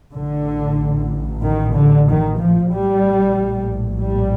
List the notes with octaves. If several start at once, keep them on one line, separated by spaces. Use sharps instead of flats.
A1 A2 D3
D#3
D3
D#3
F3
A#1 A2 G3
G3